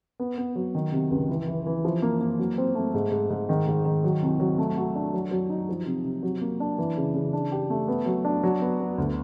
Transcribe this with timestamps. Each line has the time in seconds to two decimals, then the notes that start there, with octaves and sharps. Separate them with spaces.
0.20 B3
0.38 B3
0.56 F#3
0.75 D#3
0.92 C3
1.11 C#2
1.29 E3
1.47 E3
1.66 E3
1.85 F3
2.02 A#3
2.21 A#3
2.38 F#3
2.58 C4
2.75 A3
2.94 G#2
3.12 G#2
3.30 G#2
3.49 D#3
3.67 G#2
3.85 D#3
4.04 F#3
4.22 C2
4.40 F#3
4.58 A3
4.77 F#4
4.95 D4
5.14 F#3
5.31 F#3
5.50 D#4
5.69 F3
5.86 C3
6.04 C3
6.23 F#3
6.41 A#3
6.60 D4
6.78 E3
6.97 C#3
7.15 C#3
7.33 D4
7.52 G4
7.70 A3
7.88 B3
8.06 F#3
8.25 D4
8.44 F#3
8.62 B3
8.80 B3
8.98 D2